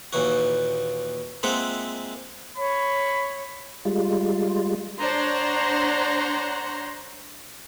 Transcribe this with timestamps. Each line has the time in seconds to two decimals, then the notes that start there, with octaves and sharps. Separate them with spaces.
0.13 D#2 A#2 E3 F#4
1.43 G#3 A#3 C4 F4 E5 F#5
2.57 C#5 B5
3.85 G3 G#3 F4
5.00 D4 C5 C#5 F#5 A#5 C6